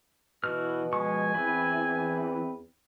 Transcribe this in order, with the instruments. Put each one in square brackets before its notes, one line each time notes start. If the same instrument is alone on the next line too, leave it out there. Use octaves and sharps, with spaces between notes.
[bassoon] B2 [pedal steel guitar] E3 F#4 F6
[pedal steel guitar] F3 G#3 C#6 [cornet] G#5
[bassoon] E2 [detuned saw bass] E3 [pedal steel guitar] C4 B4